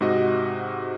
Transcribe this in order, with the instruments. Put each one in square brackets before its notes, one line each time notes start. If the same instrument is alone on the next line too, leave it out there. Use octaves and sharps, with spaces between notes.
[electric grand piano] G#2 C3 F#4 D#5